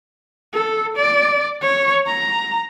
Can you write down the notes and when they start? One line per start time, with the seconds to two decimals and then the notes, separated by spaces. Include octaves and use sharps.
0.54 A4
0.97 D5
1.62 C#5
2.07 A#5